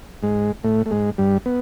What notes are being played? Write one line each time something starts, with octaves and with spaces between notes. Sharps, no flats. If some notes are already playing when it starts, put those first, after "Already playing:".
G#2 G#3
A2 A3
A3
G#2 G#3
G2 G3
B3